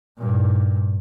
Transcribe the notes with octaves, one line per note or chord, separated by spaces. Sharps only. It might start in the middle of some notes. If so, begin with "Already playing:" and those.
G2 A#2